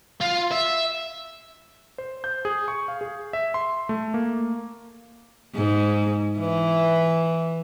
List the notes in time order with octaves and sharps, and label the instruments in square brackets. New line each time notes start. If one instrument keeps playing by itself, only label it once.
[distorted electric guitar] F4
E5
[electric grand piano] C5
G6
G#4
C#6
F5
G#4
E5
C6
A3
A#3
[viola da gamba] G#2
E3